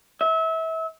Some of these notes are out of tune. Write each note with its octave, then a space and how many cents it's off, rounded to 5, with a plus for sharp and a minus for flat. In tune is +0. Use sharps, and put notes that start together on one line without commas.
E5 -30